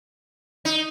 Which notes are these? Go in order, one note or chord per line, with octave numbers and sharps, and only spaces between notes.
D#4